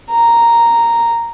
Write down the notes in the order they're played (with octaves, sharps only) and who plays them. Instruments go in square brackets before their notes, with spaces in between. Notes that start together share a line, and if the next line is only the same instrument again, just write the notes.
[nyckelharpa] A#5